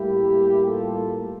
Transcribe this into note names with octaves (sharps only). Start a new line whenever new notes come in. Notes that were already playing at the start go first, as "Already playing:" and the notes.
Already playing: A2 G3 A#3 E4 G4
F4 A4